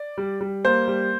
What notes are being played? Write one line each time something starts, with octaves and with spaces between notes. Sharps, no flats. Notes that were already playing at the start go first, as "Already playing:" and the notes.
Already playing: D5
G3
G3
A#3 C5
G3